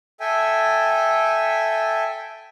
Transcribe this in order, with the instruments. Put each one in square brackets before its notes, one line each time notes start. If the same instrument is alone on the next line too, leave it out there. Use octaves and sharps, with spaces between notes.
[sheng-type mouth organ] A4 E5 G5 G#5